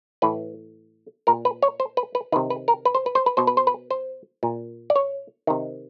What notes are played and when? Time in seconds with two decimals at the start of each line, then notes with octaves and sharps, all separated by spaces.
0.22 A2 E3 B4
1.27 A#2 A#4
1.45 B4
1.62 C#5
1.80 C5
1.97 B4
2.15 B4
2.32 D#3 B4
2.36 C3
2.50 B4
2.68 A#4
2.85 B4
2.95 C5
3.06 B4
3.15 C5
3.26 B4
3.37 B2 C5
3.47 B4
3.57 C5
3.67 B4
3.91 C5
4.43 A#2
4.90 D5
4.96 C#5
5.47 C3 D#3